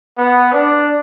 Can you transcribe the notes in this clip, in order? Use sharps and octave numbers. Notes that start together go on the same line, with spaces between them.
B3
D4